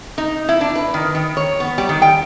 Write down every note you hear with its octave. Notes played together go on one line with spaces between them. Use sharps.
D#4
E4
D4
B4
D#3
D#3
C#5
B3
G3
D#3
G5